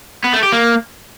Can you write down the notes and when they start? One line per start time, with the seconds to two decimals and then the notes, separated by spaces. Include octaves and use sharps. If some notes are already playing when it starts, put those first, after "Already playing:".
0.24 B3
0.33 A3
0.43 G4
0.52 A#3